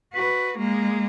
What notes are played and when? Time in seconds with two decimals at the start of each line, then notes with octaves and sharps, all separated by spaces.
0.14 F#4 B4
0.58 G#3 A#3